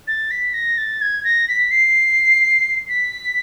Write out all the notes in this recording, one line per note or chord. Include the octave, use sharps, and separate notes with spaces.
A6
B6
A#6
A6
G#6
A#6
B6
C7
B6